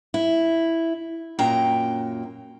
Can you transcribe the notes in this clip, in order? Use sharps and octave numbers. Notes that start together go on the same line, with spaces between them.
E4
F#2 A#2 G5 A#5